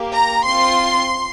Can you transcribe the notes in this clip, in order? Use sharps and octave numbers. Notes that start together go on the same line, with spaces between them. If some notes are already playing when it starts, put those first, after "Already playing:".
Already playing: A#3 G4
A#5
C4 F4 C6